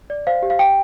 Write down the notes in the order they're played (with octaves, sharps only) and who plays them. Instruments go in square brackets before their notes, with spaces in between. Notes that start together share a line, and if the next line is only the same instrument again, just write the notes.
[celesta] D5
C5 F5
G4
F5
G4 G5